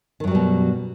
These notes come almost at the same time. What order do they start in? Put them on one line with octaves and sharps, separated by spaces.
D#3 F#2 F#3 G3 B2